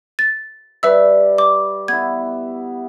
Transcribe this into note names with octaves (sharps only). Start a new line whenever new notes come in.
A6
G3 B4 E5 E6
D6
B3 E4 G#6